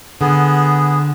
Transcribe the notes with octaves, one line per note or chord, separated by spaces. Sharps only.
D3 B3 G#4